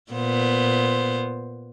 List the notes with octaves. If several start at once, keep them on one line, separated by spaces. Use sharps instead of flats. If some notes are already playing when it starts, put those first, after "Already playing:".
A#2 B3 C5